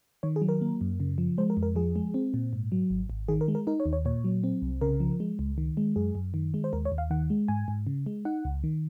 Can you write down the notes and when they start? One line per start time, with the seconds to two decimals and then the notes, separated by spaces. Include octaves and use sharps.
0.23 D#3 C#5
0.36 G#4
0.42 F#3
0.49 A#4
0.61 A#3
0.81 F#2
1.00 C#3
1.18 F3
1.38 G#3 C5
1.50 A#4
1.57 F2
1.63 A#4
1.76 F3 G#4
1.96 G#3
2.14 C4
2.34 A#2
2.53 G#2
2.72 F#3
2.90 G#1
3.10 G#1
3.28 D#3 G#4
3.41 A#4
3.48 G#3
3.55 A#4
3.67 D#4 A#4
3.80 C#5
3.86 D#2
3.93 C#5
4.05 A#2 C#5
4.24 F#3
4.44 C4
4.62 C2
4.81 C#3 A#4
5.00 F3
5.20 G#3
5.39 C#2
5.58 D#3
5.77 G#3
5.96 F#2 G#4
6.15 F#2
6.34 D#3
6.54 G#3
6.64 C5
6.73 D#2 A#4
6.85 C#5
6.92 D#2
6.98 F5
7.10 D#3 F#5
7.30 G#3
7.48 G#2 G#5
7.68 G#2
7.87 C#3
8.06 G#3
8.25 D#4 F#5
8.45 C#2
8.64 D#3